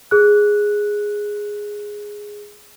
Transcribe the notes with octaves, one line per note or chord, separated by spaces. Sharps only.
G#4 F#6